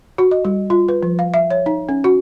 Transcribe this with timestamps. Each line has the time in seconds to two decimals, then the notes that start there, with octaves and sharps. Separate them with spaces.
0.18 F#4
0.31 D#5
0.45 G3
0.70 F4
0.89 B4
1.03 F3
1.19 F5
1.34 E5
1.51 C#5
1.66 D#4
1.89 C#4
2.04 F#4